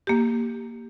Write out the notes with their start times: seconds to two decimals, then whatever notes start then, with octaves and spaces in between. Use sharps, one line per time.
0.07 A#3 G4